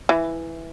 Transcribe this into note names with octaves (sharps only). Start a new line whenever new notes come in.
E3